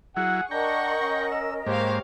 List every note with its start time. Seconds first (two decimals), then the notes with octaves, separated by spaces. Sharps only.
0.17 F#3 E4 G#4 F#5
0.51 D4 A#4 D#5 F#5 G5 A#5 C#6
1.02 C#4
1.32 E6
1.66 G#2 A#3 G4 C5 C#5 F5